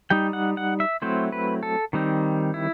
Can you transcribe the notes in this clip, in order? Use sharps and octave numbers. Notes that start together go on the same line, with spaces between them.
G3 D#4 G5
F#5
F#5
E5
F#3 A3 C4 E4 C5
B4
A4
D#3 G3 C4 D#4
E4